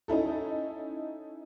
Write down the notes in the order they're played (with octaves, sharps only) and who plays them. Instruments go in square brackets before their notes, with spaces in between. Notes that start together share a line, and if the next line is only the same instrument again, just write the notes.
[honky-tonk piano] C#4 D#4 E4 A4